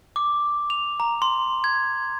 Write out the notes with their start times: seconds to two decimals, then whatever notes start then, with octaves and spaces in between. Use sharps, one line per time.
0.16 D6
0.70 F7
1.00 A#5
1.22 C6
1.64 G#6